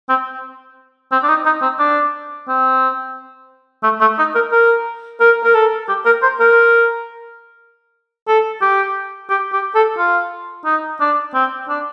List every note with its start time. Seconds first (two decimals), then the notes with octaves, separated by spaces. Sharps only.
0.09 C4
1.12 C4
1.23 D4
1.29 D#4
1.46 D#4
1.62 C4
1.79 D4
2.48 C4
3.84 A3
4.01 A3
4.19 D#4
4.35 A#4
4.52 A#4
5.20 A#4
5.44 A#4
5.55 A4
5.89 G4
6.06 A#4
6.22 C5
6.40 A#4
8.28 A4
8.62 G4
9.30 G4
9.53 G4
9.75 A4
9.98 F4
10.65 D#4
11.01 D4
11.34 C4
11.69 D4